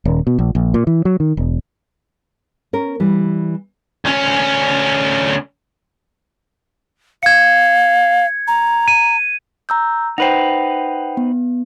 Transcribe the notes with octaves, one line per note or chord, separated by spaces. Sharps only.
D#1
B2
A#1
A#1
A#2
E3
F#3
D#3
E1
C#4 A#4
E3 G3
D2 C#4
F5 G#6 C#7
A#5
D#7
A#5 E6 G6
D#4 B4 C5 F#5 G5
B3